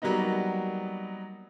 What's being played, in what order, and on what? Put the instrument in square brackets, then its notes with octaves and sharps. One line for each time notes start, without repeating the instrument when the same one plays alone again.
[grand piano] F#3 G3 A#3 B3 D#4